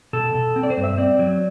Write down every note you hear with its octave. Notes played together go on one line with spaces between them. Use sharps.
B2 A4
B2
C4
D5
C5
G2
E5
C4 D5
F#3